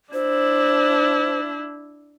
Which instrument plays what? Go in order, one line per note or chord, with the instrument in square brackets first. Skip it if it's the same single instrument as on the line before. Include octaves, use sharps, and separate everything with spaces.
[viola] D4 E4 [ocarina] C5